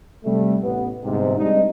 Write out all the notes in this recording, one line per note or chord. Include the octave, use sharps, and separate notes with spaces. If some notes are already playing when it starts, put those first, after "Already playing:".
C3 G3 A3
A1 B3
G1 G#2 C3
G3 G#3 C4 D4 D#4